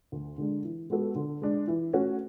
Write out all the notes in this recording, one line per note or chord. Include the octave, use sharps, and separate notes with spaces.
D2
D3 G#3 D4
E3
G#3 B3 F#4 A4
D3
G#3 D4
E3
A3 C#4 F#4